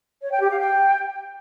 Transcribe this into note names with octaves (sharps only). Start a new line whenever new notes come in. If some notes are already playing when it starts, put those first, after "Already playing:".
C#5
G5
G4
F5
G5